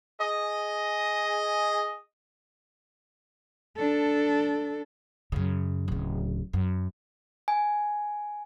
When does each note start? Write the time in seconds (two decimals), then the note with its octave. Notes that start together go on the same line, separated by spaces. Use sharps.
0.21 G#4 D#5
3.77 D4 A4
5.32 F#2 C#3
5.88 D1 C#3
6.53 F#2
7.48 G#5